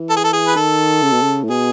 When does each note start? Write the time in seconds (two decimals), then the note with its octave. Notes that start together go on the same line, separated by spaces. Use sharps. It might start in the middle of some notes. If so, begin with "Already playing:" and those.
Already playing: E3
0.10 A4
0.16 G#4
0.24 A4
0.33 G#4
0.48 B4
0.56 D#3 A4
1.03 C#3
1.13 B2
1.22 C#3
1.44 A2
1.50 B2 G#4